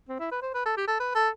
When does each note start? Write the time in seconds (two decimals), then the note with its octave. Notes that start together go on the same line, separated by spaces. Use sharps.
0.09 C4
0.19 E4
0.31 B4
0.42 C5
0.54 B4
0.66 A4
0.77 G4
0.88 A4
1.00 B4
1.15 A4